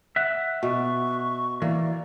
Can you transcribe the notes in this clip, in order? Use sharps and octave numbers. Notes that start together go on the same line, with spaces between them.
E5 F#5
B2 C#6
E3 A#3 D5